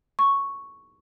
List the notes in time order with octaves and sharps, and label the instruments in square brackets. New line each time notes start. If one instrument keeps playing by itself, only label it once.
[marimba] C#6